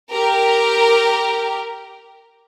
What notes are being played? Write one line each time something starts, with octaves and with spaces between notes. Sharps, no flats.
G4 A#4